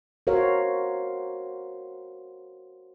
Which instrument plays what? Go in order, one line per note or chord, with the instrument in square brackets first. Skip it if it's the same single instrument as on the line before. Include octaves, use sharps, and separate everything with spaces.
[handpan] F#4 A#4 C5 C#5 F5